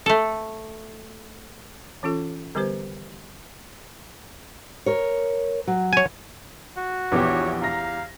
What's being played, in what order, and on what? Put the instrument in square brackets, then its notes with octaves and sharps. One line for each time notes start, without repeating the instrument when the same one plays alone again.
[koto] A3 A4
[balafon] E3 C#4 F4 A4
D3 G3 B3 G4 B4 C5
[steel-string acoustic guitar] A#4 C#5
F#3
[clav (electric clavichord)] C#5 G#5
[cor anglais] F#4
[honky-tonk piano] A#1 B3 D6 [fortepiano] E2 G4 [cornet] C#5
[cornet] F5 [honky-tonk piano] A#5 A#6